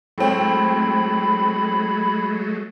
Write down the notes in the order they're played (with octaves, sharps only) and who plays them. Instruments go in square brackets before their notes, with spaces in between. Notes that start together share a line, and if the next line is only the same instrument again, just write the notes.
[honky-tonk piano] A2 C4 [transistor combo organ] F#3 G#3 A3 [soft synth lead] B5